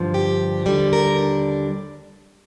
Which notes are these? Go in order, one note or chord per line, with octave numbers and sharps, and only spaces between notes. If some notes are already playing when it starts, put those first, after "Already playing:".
Already playing: G2 D3 F3
G4
D#2 D3 G3 A4
A#4
D4